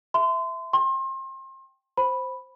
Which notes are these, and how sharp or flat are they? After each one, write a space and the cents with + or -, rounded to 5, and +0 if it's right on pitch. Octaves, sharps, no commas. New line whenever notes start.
E5 +0 C6 -30
G5 +0 C6 +35
C5 +0 B5 -5